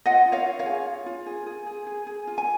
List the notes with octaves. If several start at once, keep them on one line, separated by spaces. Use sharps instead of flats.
F4 D#5 F#5
F4
C#5 F5
F4
C#5 F5
G#4
F4
F4
G#4
G#4
G#4
G#4
G#4
F4
G#5